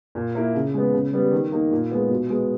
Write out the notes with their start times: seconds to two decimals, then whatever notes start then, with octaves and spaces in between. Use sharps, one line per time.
0.15 A#2
0.35 A#3 E4
0.55 C#3
0.74 G#3 B3
0.93 C#3
1.13 G3 B3
1.32 D#3
1.52 A#3 D#4
1.72 A#2
1.91 G#3 B3
2.10 B2
2.30 G#3 B3